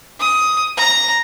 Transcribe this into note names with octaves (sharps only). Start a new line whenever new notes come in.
D#6
A#5